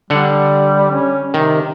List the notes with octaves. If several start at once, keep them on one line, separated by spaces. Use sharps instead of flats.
D3 G3 F#5
C#4
C3 D#3